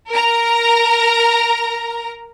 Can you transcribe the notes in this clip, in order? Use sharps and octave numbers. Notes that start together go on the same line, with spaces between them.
A#4 A#5